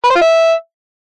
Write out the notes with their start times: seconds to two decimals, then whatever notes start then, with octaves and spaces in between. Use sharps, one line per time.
0.04 B4
0.10 C5
0.16 F4
0.21 E5